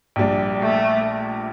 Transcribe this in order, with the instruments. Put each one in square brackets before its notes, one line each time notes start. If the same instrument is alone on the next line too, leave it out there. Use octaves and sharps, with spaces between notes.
[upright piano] A#1 A#2 G3 D4
[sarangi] A3